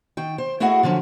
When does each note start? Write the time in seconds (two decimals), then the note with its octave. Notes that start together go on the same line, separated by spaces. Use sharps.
0.17 D#3 G5
0.38 C5
0.60 A3 E4 F#4 G#4 D#5 F#5
0.83 D3 F3 F#3 C#4